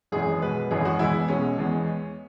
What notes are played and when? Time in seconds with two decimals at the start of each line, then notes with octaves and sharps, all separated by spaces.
0.12 G#1 F#2 E3 G#3 G#4
0.42 B1 B2 G#3 B4
0.71 G#1 F#2 E3 G#3 G#4
0.85 F#4
0.99 E1 E2 E3 G#3 E4
1.28 B1 B2 G#3 C#4
1.58 E2 E3 G#3